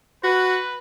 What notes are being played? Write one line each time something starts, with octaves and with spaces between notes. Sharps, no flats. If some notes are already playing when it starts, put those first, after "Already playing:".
F#4 B4